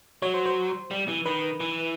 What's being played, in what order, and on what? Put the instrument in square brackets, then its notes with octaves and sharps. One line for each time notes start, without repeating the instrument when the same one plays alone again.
[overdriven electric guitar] F#3 [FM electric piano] C#5
[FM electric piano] C5
C5
[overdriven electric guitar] G3
E3
[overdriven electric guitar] D#3 [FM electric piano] B4
[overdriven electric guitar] E3